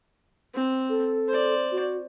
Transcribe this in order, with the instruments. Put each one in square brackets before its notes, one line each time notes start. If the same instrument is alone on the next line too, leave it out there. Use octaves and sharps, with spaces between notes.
[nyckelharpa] C4
[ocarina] A4
[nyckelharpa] C5 D5
[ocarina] F#4